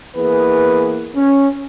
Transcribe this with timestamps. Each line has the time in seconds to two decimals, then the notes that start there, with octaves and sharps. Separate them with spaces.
0.16 E3 A#3 B3 G#4 B4
1.16 C#4